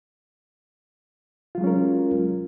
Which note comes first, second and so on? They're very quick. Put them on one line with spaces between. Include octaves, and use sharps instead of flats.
F4 F#3 G#3 C#4 A#4